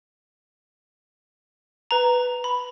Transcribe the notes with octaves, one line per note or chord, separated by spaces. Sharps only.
B4 A#5
B5